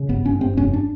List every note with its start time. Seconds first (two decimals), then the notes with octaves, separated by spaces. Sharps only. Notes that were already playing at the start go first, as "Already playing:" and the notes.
Already playing: C#3
0.09 G1 B3
0.25 G1 C#4
0.40 G2 C4
0.57 F1 C#4
0.73 D4